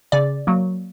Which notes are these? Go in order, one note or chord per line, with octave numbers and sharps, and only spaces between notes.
C#3 D5
F#3 A#3